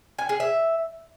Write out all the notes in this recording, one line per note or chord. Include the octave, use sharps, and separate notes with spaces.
G#5
G#4
E5